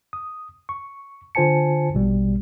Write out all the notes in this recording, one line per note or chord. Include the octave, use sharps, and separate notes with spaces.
D#6
C#6
D3 F4 C5 G#5 A5 C#7
A#1 B2 G3